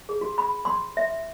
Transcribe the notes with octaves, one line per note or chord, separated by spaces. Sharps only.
G#4
F#4
B5
C6
E5